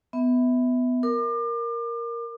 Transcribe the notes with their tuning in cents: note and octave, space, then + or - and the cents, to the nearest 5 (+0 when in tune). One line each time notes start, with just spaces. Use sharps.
B3 +15 E5 -20
A#4 +0 D6 +35